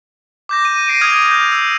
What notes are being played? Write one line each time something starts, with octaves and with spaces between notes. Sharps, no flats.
D6 G6 A#6
D#7
A#6 C7 D7 D#7
D#6 F6 G#6
G6
E6